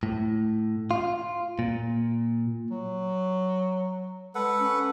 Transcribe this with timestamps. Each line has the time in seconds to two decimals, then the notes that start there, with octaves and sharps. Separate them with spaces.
0.03 A2
0.91 F4
1.59 A#2
2.71 F#3
4.35 G#3 A4 B4 F#5
4.60 C#4